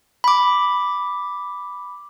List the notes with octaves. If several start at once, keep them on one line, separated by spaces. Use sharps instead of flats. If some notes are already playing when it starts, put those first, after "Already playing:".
B5 D6